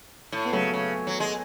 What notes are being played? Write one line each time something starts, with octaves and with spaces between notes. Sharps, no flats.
A2
B3
C#3 F#3 A3
C#3
F#3
G#3